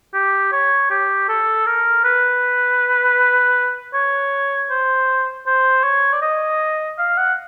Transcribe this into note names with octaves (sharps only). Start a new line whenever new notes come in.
G4
C#5
G4
A4
A#4
B4
C#5
C5
C5
C#5
D5
D#5
F5
F#5